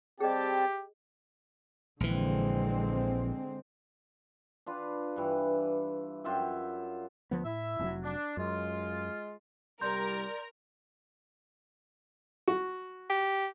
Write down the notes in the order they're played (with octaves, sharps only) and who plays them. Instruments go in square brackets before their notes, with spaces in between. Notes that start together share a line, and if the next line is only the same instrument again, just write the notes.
[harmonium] G3 C4 A5 [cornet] G4 [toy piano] G#4 D#5 [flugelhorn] G5
[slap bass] A#1 E3 [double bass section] D3 G#3 C4
[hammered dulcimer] D4 F4 B4
G2 E3
F#2 F4 E5 G5
[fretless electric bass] D2 F3 B3
[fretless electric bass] A2 [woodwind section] E4 E5
[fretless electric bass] F1 A2 F#3
[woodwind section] D4
[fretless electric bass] F#2 [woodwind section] G#3 F4
[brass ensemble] C2 G3 [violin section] A#4 [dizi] D5 [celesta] C6 G6
[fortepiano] F#4
[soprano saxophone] G4